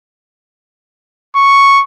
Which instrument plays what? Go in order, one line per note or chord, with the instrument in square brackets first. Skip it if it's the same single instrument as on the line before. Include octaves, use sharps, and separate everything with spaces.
[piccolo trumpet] C#6